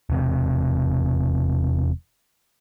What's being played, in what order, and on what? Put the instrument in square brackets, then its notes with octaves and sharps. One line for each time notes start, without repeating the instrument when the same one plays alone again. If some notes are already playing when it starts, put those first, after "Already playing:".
[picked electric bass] E1 C3